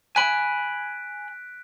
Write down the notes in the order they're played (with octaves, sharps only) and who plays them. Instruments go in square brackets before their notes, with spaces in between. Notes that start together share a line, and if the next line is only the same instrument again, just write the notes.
[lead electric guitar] G#5 B5 [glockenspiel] F#6 B6 D7